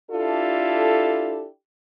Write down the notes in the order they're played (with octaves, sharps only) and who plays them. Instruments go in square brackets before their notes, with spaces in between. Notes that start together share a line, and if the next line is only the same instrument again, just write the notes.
[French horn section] D4 E4 F4 G4 A4